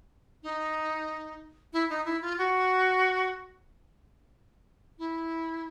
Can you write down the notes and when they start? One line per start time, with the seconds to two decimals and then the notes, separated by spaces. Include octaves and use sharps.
0.43 D#4
1.73 E4
1.90 D#4
2.05 E4
2.22 F4
2.38 F#4
4.99 E4